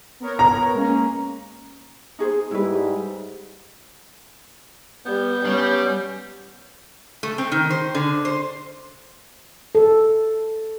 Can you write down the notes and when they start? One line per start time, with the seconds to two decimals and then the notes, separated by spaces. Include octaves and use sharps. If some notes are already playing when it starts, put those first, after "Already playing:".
0.20 B3 A#4 C#5
0.39 A#5
0.74 G#3 A#3 C#4
2.19 D#4 G#4 C5
2.51 G#2 G3 E4 B4
5.06 G3 B3 G6
5.45 G3 C#4
7.23 A3
7.38 C4
7.52 D#3
7.70 C5
7.95 D3
8.25 C5
9.75 A4